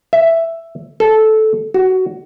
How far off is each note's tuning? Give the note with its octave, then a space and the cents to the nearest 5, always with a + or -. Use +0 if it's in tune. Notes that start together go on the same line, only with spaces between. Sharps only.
E5 +5
A4 -10
F#4 +15